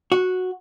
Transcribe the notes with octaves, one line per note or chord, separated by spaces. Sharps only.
F#4